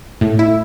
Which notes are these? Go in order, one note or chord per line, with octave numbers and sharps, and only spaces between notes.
A2
E4